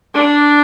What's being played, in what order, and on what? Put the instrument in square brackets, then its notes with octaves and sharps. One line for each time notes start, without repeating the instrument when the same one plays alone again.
[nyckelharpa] D4